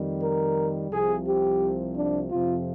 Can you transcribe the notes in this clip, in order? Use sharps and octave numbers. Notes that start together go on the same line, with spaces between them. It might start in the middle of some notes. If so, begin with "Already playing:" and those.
Already playing: F2 D#3 G3
A#4
C2 C3 F3 G#4
G4
D4
F2 C3 F3 C4 F4